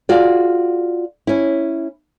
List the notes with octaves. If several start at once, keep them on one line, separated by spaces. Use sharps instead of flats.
F4 F#4 G#4 D5
C#4 E4